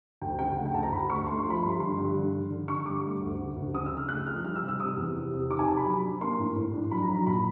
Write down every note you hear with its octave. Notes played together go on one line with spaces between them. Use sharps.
D2 G5
C#3 G5
A3 F#5
G5
D2 A5
A#5
D2 B5
A3 C#6
A3 C6
C6
F3
B5
G2 C6
D3 C6
G2
D3
D3
D3
D3 C#6
G2 D6
A3
D2
C#3
D2
C#3 D#6
E6
C#3
F6
A3 F#6
F3 F6
G3 F6
E6
C3
E6
C3 D#6
E2
C3
C3
D#3 D6
G#5
C3 A5
B5
F#3
D4
A#3 C6
A2
A2
D4
F#3 B5
A#5
F#3
A#5
A#2 B5